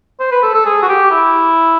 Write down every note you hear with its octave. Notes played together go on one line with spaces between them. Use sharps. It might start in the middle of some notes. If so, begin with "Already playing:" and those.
C5
B4
A4
A4
G#4
F#4
G4
E4